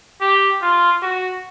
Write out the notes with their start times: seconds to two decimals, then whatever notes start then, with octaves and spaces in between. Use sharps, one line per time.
0.21 G4
0.62 F4
1.02 F#4